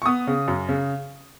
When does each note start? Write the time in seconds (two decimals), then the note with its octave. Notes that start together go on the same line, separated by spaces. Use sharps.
0.02 C#6
0.06 B3 D#6
0.27 C#3
0.48 F#2
0.69 C#3